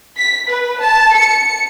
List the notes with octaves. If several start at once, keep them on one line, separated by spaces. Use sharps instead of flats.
B6
B4
A5
C#7